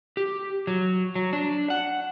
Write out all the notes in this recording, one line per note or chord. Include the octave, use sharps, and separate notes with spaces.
G4
F#3
F#3
D4
F#5